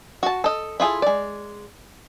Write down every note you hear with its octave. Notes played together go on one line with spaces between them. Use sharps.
F#4 A5
A4 D#5
E4 F4 G#4 A4
G#3 D5